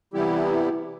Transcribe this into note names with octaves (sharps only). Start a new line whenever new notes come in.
C3 E3 G3 B3 E4 G4